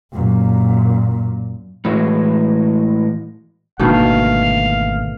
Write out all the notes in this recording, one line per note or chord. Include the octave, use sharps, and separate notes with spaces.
F#2 A#2
A2 E3 G#3 E4 F#4
G#1 B2 D3 D#3 A3 A#3 F5